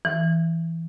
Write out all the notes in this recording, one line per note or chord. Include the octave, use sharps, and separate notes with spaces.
E3